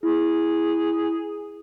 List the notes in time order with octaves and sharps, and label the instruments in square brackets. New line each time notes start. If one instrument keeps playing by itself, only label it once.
[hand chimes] E4 [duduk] G#4